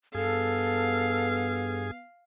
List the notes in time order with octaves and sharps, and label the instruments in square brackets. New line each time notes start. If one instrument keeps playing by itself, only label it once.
[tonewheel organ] G2 G#4 [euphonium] B3 [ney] A4 [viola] F5